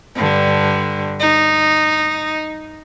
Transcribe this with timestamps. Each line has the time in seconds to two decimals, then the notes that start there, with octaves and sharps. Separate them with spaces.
0.16 G2 D3
1.20 D#4